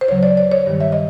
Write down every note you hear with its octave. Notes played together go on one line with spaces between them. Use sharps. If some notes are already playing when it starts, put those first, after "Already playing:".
C5
D2 C#3 F#3 C#5
D5
D5
C#5
G2 D#3 G3
E5
D#5